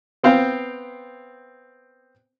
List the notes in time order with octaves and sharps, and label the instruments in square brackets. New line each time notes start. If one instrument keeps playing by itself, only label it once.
[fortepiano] B3 C4 F5 G5